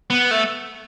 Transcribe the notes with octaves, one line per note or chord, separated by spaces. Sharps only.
B3
A3